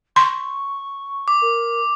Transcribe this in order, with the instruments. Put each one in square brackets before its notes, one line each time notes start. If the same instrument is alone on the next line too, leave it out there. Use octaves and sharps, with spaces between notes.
[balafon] C6 [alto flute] C#6
[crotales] D6
[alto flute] A#4